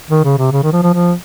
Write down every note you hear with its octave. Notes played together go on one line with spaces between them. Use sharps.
D#3
C#3
C3
C#3
D#3
F3
F3
F3